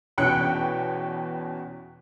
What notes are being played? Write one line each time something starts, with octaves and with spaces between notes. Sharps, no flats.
E2 B2 C#4 G5 F#6 C#7